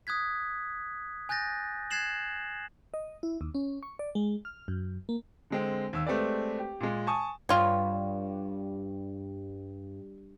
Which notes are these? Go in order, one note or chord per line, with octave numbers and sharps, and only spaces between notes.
D#6 F#6 G#6 B6
G#5 F#6 G6 A6 A#6
F#6 G#6 A6 C7 E7 F#7
D#5
E4
D#2
C#4
C#6
D5
G#3
F6
F#2
A#3
D3 G#3 C4
D#2 E6
G#3 A3 C4 G4 B4 D5
G4
A#2 G#3
G#5 A5 C#6 D#6
G2 F4 C#5